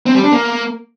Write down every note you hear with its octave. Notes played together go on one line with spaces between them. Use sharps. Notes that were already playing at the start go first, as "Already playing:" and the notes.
C4
G3
D4
A#3